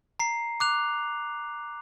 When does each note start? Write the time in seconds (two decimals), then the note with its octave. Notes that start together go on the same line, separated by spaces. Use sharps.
0.19 A#5 C7
0.60 D6 F#6 F7